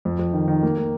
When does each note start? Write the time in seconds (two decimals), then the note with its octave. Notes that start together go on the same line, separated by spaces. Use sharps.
0.05 F2
0.19 F2
0.33 D#3
0.48 D#3
0.63 A#3
0.78 A#3